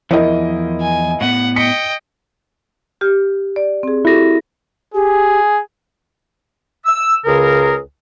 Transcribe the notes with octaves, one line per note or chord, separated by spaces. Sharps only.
E2 F3 E4 A#4 D#5
G#5
A2 B3 F#5
D#5 G5 B6 C#7
G4 F6
D5
C4 G#4
E4 F#4 G4 A4 A#6
G4 G#4
E6
C#2 C#3 G#4 A#4